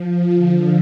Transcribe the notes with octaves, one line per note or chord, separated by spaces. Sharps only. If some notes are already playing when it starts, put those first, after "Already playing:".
Already playing: F3
D3